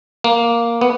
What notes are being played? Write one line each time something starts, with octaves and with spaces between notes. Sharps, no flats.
A#3
B3